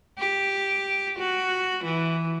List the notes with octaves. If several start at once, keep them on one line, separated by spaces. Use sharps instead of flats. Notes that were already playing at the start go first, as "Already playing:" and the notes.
G4
F#4
E3